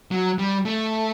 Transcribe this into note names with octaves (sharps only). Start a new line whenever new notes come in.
F#3
G3
A3